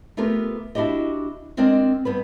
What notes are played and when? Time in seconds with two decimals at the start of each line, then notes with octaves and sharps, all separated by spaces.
0.17 A3 B3 F4 G4 A#4
0.75 D4 E4 F#4 G4 D#5
1.57 G#3 C4 D4 A#4 D5 D#5
2.05 G2 B3 B4